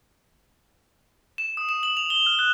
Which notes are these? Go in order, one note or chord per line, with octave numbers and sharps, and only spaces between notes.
E7
D#6
E7
F#7
F7
G7
F6
F#6